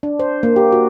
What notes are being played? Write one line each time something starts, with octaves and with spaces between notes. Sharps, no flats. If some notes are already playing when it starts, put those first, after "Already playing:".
D4
C5
A#3
G4
F#4